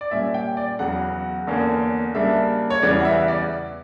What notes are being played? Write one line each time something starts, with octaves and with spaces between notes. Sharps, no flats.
D5
A#2 G3 C#4 E5
G5
D5
E2 C#3 F#3 F#5
E2 D3 A#3 C#4
C#3 G3 A#3 D4 E5
C#5
E2 C#3 E3 G3 D5
F#5
E5
D5